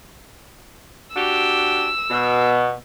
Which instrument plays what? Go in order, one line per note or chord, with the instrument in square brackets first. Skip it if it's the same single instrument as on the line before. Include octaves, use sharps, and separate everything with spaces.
[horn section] D4 F#4 G4 [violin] E6
[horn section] B2